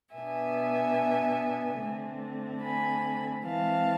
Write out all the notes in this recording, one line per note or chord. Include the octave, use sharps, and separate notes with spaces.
B2 B3 D4 E5 G#5
D3 A3 C4
G#5 B5
E3 G#3 C4 F5 A5